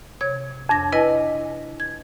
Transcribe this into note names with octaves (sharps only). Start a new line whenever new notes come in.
C3 C#5 G#6
F2 D4 A#6
E4 B4 D#5 G#5
G#6